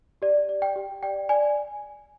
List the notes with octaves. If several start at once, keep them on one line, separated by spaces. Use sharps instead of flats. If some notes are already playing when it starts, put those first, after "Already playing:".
G4 D5
D5
G5
G4
D5 G5
D5 G#5